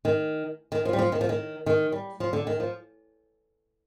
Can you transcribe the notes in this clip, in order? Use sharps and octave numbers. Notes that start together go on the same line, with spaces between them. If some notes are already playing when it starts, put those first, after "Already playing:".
D#3
D#3
F3
G3
F3
D#3
F3
D#3
D#3
G3
F3
D3
D#3
F3